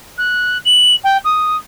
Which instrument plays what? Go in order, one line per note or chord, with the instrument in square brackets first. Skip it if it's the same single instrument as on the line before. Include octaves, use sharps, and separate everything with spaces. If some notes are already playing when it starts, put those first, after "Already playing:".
[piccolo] F#6
F#7
G5
D#6